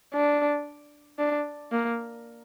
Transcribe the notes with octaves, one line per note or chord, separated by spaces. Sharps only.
D4
D4
A#3